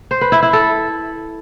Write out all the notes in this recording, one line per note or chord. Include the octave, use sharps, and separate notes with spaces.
C5
B4
E4
E4
A4